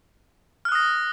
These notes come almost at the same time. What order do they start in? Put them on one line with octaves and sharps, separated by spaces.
F6 F#6 D#6 A#6